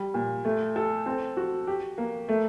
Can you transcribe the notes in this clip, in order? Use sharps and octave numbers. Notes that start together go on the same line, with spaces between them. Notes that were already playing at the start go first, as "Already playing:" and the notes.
Already playing: G3
A#2
A3
A4
C4
F#4
G4
A#3
A3